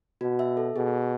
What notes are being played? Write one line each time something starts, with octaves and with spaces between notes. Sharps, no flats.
B2 F#4
E5
A4
B2 G#4